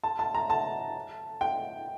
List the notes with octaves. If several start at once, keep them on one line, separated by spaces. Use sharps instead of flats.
A5
A5
A#5
A5
G5